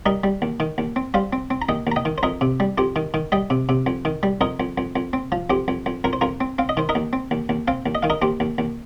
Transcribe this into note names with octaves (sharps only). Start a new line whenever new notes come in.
G3 A#4 D#5
G3
D#2
D#3
D#2
C4
G3 C5 F5
C4
C4
A#5
D#2 D#5 G5
D#2 A#5
D#5 G5
D#3
C5
F2 A#4 D#5
C3
G3
F2 G4 C5
D#3
D#3
G3 D#5 G5
C3
C3
F2
D#3
G3
F2 A#4 D#5
F2
F2
F2
C4
F3
F2 G4 C5
F2
F2
F2 A#4
C5
F2 F4 A#4
C4
C4 F5
D#5
D#3 C5
A#4 D#5
D#2
C4
D#2
D#2
C4 C5 F5
D#2
D#5
D#3 F5
A#4 D#5
D#2 G4 C5
D#2
D#2